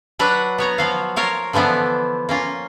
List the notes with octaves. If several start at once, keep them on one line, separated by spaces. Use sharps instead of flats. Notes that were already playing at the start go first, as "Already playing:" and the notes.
F#3 D4 B4 F#5
B3 C#5 A#5
F3 F#3 F5
F4 A#4 C#5 F5
D3 E3 F3 B3 D4
A#3 C#4 F4